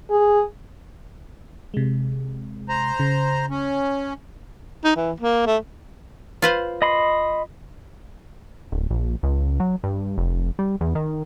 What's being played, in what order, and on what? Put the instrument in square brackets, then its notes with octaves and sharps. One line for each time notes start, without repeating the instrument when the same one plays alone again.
[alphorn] G#4
[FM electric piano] C3 G#3
[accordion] C5 A#5
[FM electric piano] C#3
[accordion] C#4
[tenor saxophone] D#4
E3
A#3
A3
[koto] F4 B4 C5
[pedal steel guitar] D#5 B5 C6
[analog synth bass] D1
A#1
C#2
F#3
G2
F1
G3
E2
D#3